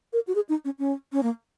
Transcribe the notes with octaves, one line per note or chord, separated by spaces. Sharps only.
A#4
F#4
G#4
D#4
C#4
C#4
C#4
A#3